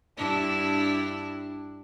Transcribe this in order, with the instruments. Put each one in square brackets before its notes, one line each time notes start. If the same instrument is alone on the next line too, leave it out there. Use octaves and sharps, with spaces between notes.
[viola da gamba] G2 E4 [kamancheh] D4